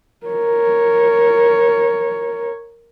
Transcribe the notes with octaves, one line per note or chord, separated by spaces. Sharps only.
A#4 C#5